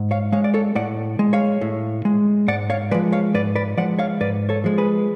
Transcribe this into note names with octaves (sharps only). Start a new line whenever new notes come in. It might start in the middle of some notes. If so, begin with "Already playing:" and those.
Already playing: G#2
C#5 F5
G#3 C#5 F5
D5
A4 C#5
A2 D5 F#5
G#3
C#5 F5
A2
G#3
G#2 D5 F#5
C#5 F5
F3 G#3 B4 D5
C#5 F5
G#2 B4 D5
B4 D5
F3 G#3 D5 F#5
C#5 F5
G#2 B4 D5
A4 C#5
F3 G#3
G#4 B4